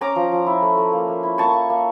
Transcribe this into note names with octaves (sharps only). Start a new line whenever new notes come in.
C#4 A#5 D6
F3
F3
E4
A3
A3
A#3
A#3
E4
A#3 A5 C#6
A#3
A#3